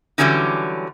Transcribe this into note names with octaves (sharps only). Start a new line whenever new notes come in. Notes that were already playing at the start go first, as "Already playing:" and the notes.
D3 E3 F#3 G3 C#4 D#4